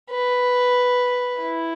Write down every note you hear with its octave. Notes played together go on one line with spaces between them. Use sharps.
B4
E4